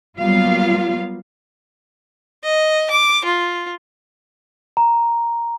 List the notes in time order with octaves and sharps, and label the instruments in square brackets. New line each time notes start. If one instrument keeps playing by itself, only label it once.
[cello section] F#3 G3 A#3 B3 F4 F5
[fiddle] D#5
D6
F4
[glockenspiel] A#5